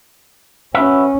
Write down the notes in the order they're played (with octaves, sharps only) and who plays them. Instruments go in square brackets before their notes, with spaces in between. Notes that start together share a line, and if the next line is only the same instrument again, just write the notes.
[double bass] C#4 [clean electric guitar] F#4 B4 E5